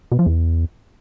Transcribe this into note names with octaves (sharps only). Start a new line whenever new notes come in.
B2
F3
E2